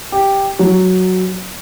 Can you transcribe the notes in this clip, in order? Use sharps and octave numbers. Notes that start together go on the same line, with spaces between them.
G4
F#3